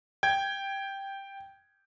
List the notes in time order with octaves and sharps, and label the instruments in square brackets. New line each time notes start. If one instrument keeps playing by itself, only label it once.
[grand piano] G5 G#6